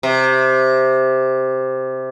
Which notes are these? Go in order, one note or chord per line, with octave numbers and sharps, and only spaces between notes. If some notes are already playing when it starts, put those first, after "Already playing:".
C3